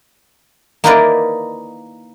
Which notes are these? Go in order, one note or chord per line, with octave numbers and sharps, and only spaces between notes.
A#3 D#4 E4 A#4 B4 D5